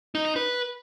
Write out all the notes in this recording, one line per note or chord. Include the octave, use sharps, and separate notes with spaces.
D#4
D#4
B4